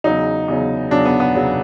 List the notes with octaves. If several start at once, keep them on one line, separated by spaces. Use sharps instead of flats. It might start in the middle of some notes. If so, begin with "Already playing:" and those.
E2 C#3 F#3 D#4
E2 C#3 F#3
E2 C#3 F#3 D4
B3
B3
E2 C#3 F#3